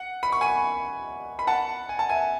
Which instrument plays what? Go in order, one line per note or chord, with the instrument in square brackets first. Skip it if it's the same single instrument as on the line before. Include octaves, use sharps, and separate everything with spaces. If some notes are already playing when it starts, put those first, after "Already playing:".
Already playing: [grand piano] F#5
B5
C#6
G#5 B5
B5
F#5 A5
G#5
A5
E5 G#5